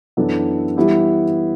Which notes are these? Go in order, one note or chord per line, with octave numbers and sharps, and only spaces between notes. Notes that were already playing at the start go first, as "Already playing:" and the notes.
F#2 E3 B3 D4 A4
E3 G3 B3 E4 G4